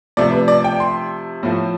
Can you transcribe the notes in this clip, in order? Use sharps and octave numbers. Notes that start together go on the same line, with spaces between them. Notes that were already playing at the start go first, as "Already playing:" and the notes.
C3 F3 A3 D5
B4
D5
G5
C6
A2 F3 A3